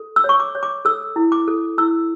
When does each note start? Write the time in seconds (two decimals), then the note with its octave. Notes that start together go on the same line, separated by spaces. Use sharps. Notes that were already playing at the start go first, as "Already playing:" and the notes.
Already playing: A4
0.16 E6
0.24 C#5
0.29 C#6
0.40 D6
0.55 C#5
0.63 D6
0.85 A4 E6
1.16 E4
1.32 D6
1.48 A4
1.78 E4 E6